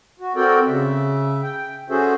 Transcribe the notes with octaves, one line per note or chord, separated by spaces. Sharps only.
F#4
C4 F#4 A4 A#4 D5 G5
C#3 E5
G5
C#4 F#4 G#4 A4 C5 E5